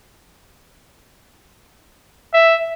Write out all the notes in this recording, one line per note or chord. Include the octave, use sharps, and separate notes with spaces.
E5